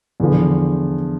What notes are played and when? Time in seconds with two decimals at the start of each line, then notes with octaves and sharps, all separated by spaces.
0.20 E2 D3 F3